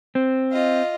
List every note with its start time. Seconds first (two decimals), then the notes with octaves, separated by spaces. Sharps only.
0.15 C4
0.52 F4 D#5